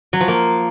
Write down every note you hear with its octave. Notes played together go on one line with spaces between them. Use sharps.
F#3
F3
A#3